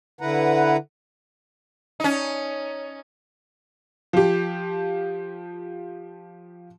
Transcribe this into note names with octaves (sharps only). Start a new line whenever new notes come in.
D3 E4 B4 F#5 A#5
C#4 D#4
F3 G4